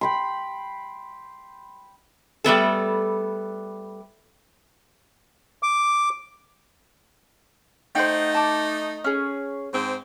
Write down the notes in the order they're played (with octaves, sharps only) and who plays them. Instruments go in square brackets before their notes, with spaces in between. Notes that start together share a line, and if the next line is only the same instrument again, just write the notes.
[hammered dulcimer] G5 B5 C6
[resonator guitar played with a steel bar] G3 A3 B3 A4
[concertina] D6
[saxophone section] A3 D#4 [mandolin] C5 F#5 G5
[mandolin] A5 D6
C#4 G#4
[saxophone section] G#2 C4